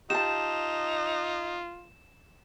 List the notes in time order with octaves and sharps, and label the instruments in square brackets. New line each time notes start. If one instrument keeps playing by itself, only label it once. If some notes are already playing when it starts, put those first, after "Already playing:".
[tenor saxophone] D#4 [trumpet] F4 [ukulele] G4 A5 [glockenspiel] E7